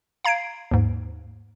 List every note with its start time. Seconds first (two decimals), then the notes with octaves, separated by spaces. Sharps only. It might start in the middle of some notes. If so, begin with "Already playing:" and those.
0.25 F5 A#5 G#6 C7 D7
0.71 D#2 G#2